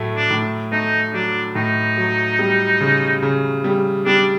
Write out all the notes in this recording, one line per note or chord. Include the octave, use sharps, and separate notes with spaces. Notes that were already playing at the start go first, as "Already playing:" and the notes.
Already playing: A2 F#3 A3
D4
A2
A3 D#4
F#3 D4
A2 D#4
F#3
G3
C#3
C#3
G3
G3 D4